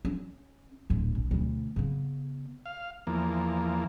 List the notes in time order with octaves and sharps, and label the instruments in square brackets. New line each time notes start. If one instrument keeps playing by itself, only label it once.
[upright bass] C#4
D1 A#1
A#1
D2 B2
C#3 B3
[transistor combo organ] F5
E2 F3 A#3